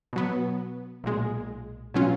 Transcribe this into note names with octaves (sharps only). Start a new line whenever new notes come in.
B2 F#3 B3
B1 A#2 G#3
B2 F#3 C#4 F4